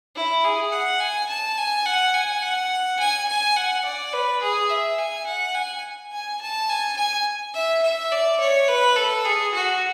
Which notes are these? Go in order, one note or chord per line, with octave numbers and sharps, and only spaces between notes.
E4
G#4
F#5
G#5
A5
G#5
F#5
G#5
F#5
G#5
G#5
F#5
D5
B4
G#4
E5
G#5
F#5
G#5
G#5
A5
G#5
G#5
E5
E5
D5
C#5
B4
A4
G#4
F#4